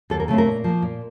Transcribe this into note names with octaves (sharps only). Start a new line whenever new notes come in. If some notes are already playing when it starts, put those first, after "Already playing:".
D#2 A4
A#4
C#3 A3 C4 A4
A#4
A#2
F3 A#3
A#2